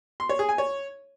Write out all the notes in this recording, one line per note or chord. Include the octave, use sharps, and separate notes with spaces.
C6
C#5
G#4
G#5
C#5